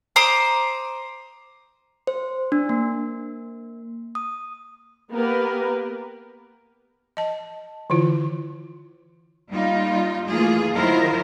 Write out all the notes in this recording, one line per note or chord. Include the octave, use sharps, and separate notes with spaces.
C5 A#5 D6 D#6
C5
D4
A#3
D#6
A#3 B3 G4 A#4 B4
D#5 A5
D3 E3 E4 F4
G3 A#3 D#4 F4
E3 A3 A#3 F4 G#4
D#3 F#3 E4 F4 A#4 C5